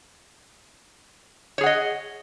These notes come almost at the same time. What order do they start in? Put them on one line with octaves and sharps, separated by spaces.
C#5 G#4 F#5 D#5